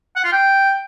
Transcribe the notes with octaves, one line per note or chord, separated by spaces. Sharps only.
F#5
F4
G5